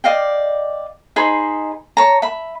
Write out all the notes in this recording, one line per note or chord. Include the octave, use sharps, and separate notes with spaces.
D5 D#5 F5 G5
D#4 G#4 C5 B5
C#5 A5 A#5
E5 B5